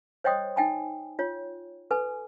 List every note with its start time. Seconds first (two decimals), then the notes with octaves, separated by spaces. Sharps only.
0.24 C5 C#5 D#5 G5 C6 D#6
0.56 D#4 G5 G#5 B5
1.19 F4 C#5
1.91 A4 B4 G#5